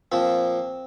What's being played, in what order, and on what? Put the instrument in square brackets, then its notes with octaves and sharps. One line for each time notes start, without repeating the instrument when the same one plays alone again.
[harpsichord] A#2 F3 C4